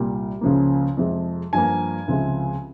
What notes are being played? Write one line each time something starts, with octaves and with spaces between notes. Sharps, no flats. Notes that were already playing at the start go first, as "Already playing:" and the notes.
Already playing: C2 A#2 G3 A#3
C#2 C#3 F3 A#3
F2 C3 F3 G#3
G2 F3 A#3 G#5
C#2 C3 F3 G#3